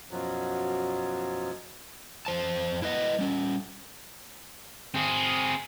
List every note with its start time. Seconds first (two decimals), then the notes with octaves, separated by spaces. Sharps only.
0.11 F#2 B2 F3 F#3
2.26 F2 C5 A5
2.82 E4 B4 D#5 F#5
3.19 G3 C#4
4.94 C4 G#4